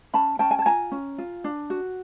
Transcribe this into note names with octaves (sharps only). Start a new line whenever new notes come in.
C#4 A5 B5
C#4 G5 A5
G#5
A5
F4 G#5 A#5
C#4
F4
D4
F#4